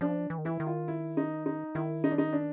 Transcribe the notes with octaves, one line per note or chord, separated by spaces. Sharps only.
F3 D4
E3
D#3
E3 E4
D#3
F4
E4
D#4
D#4
D#3 E4
D#4
D4
D#4
D4